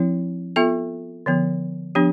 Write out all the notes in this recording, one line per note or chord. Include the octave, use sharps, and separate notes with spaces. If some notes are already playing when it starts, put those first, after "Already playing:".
Already playing: F3 C4 E4
B3 F4 A4 E5
D3 F3 B3
F3 B3 D4 G4